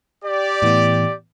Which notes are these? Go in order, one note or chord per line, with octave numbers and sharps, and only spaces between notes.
G4 D5
A2 E3 B3